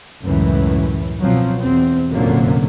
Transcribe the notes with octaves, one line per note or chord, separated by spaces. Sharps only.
C#2 F#2 A2 E3
B2 F3 F#3 C4
E2 C4
F1 F#2 A#2 D3 F#3 A#3